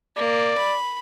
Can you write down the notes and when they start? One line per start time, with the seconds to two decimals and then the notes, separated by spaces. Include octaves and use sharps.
0.17 A#3 D5
0.58 B5